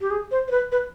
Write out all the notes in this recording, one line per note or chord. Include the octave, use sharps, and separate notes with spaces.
G4
G#4
C5
C5
B4
B4